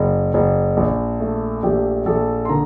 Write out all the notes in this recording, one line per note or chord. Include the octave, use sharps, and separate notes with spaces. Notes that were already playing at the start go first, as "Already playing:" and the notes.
Already playing: F#1 A#4
F#1
A#1
A3
A#1 G4 G5
A#1 A4 A5
C6
D3 A#4 A#5